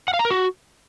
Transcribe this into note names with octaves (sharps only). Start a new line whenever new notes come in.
F#5
F5
A#5
A#4
F#4